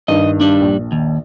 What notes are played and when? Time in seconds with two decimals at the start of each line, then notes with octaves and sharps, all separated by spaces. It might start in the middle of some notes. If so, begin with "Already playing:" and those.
0.08 G2 D#3 D#5
0.41 G3 D4
0.61 A#1
0.92 D#2